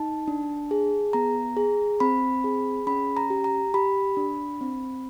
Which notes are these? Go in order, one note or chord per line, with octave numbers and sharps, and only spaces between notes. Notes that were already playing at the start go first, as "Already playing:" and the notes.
Already playing: D#4 A5
D4
G#4
B3 A#5
G#4
C4 B5
G#4
C#4 B5
A#5
G4
A#5
G4 B5
D4
C4